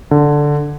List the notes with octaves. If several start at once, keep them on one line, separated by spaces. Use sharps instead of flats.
D3